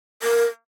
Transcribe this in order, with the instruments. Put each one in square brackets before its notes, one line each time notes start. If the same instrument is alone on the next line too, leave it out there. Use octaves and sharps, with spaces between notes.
[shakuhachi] A#4